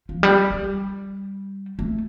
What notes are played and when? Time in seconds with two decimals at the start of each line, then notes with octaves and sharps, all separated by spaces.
0.09 F3
0.23 G3
0.50 G3
1.79 A3